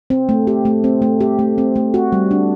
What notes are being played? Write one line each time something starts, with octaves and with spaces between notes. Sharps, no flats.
C4
A3
G4
A3
C4
A3
G4
A3
C4
A3
F#4
G3
D4